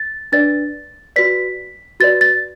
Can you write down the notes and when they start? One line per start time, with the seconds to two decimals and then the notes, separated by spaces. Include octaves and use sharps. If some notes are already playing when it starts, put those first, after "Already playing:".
Already playing: A6
0.32 D4 B4 D5 A6
1.16 F#4 B4 D5 B6
2.00 F#4 B4 D5 A6
2.21 A6